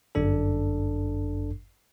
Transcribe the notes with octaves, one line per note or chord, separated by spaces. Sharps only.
G1 F#2 D4 A4